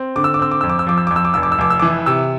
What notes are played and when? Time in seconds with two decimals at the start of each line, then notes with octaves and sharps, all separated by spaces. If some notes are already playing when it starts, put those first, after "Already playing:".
Already playing: C4
0.16 D3 D6
0.24 E6
0.34 D6
0.39 C4 E6
0.51 D6
0.61 F2 E6
0.70 D6
0.79 E6
0.87 F3 D6
0.98 E6
1.07 F2 D6
1.16 E6
1.25 D6
1.34 F1 E6
1.43 D6
1.52 E6
1.59 F1 D6
1.70 E6
1.80 E3 D6
2.06 C3 E6